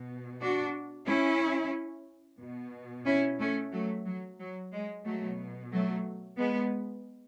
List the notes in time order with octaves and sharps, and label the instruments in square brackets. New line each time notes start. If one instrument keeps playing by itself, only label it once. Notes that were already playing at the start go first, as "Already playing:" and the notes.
Already playing: [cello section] B2
D4 F#4
C#4 E4
B2
C#4 E4
A3 C#4
F#3 A3
F#3
F#3
G#3
B2 F#3 A3
F#3 A3
G#3 B3